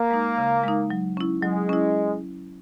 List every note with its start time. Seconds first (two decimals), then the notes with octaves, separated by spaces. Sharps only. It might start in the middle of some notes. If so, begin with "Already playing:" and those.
Already playing: A#3
0.10 G#3 D#4
0.38 C#3
0.63 G#3 D#4
0.90 F#3
1.17 C#4 E4
1.43 F#3 G#3
1.69 C#4 E4